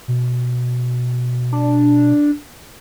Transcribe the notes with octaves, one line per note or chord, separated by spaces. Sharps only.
B2
D4